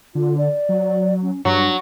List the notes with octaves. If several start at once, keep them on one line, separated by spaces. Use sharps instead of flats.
D3 F4
D5
F#3
C#4
G2 F#3 D4